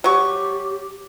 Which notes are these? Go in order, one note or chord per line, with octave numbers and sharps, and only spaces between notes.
F#3 G4 C#6